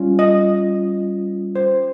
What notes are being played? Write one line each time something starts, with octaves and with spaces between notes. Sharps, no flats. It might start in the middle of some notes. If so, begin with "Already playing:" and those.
Already playing: G3 C#4 F4
D#5
C5